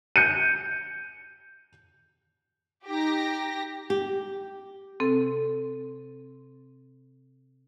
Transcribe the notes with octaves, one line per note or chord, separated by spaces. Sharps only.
G6 C#7 D#7
D#4 G4 A#6
G4
C3 C4 A4